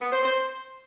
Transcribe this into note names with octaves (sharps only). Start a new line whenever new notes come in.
B3
C5
C5